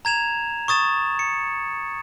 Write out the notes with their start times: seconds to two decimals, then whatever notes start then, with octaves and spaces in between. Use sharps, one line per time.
0.05 A#5 G#6 E7 F7
0.68 C#6 D#6 A6 E7
1.19 C#7